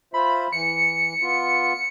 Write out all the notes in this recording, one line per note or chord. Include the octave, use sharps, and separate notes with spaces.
F4 C5 E5 B5
E3 C#7
B3 F4